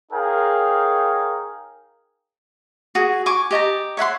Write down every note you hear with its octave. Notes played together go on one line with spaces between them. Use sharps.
D#4 G#4 A#4 C#5 F5 G5
F#4 G#4
G#5 C#6 D6
G4 D#5 A5 A#5
C#5 E5 F#5 C6